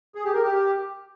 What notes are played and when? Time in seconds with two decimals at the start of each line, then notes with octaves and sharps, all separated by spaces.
0.15 G#4
0.24 G4
0.34 A#4
0.43 G4